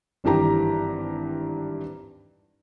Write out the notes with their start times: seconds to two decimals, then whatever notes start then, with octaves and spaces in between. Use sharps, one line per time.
0.24 G#1 G2 E3 G4 A#5